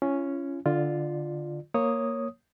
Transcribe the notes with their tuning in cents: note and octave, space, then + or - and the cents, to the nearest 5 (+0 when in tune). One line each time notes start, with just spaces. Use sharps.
C#4 +0 F4 -45
D3 +0 F4 +0 D5 +25
A#3 +0 C#5 -5 D#6 +0